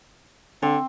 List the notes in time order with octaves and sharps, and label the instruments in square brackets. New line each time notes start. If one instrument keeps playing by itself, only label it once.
[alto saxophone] D3 [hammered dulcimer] C4